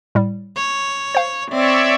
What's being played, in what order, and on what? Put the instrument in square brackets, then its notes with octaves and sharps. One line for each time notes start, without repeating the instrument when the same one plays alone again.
[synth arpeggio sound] A2 G3
[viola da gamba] C#5
[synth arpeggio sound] C5 F5
[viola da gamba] C4 [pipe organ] C#5 D5 E5